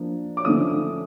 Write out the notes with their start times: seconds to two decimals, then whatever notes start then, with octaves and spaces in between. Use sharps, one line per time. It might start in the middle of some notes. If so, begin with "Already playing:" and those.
Already playing: F3 A#3 D4
0.37 D6
0.45 D3 F3 A3 C#4 D#6